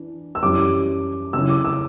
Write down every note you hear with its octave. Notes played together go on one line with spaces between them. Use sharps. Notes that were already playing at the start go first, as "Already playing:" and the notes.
Already playing: E3 D4
E6
F#2 E3 G3 C#4 E4 D6
C#3 F#3 C#4 E4 E6
D6
E6